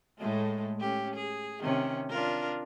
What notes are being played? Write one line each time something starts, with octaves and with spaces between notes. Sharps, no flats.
A2 G#3 A3
C#4 G4
G#4
C3 D#3 C#4
D4 F4 A#4